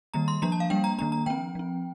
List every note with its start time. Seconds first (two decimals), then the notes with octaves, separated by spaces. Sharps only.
0.14 D#3 G3 A#3 A#5
0.28 C6
0.42 F3 A#3 D4 A#5
0.52 A5
0.60 F5
0.70 G3 A#3 D4 G5
0.84 A#5
0.99 D#3 A#3 D4 A#5
1.12 A#5
1.26 F3 C4 G5
1.55 F3 C4